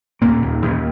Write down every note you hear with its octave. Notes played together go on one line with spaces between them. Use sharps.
D#2 A#2 A#3
D#2
D#2